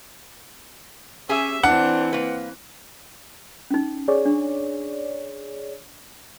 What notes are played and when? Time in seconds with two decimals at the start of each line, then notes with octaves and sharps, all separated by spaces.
1.29 C#4 G4 G#4 E5 G#5
1.63 E3 C4 D4 F#5
2.13 A#3 B4
3.71 C#4 D#4
4.08 G#4 C#5 D5
4.25 D4